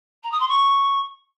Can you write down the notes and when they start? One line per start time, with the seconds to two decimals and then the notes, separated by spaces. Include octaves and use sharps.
0.23 A#5
0.31 D#6
0.40 C6
0.48 C#6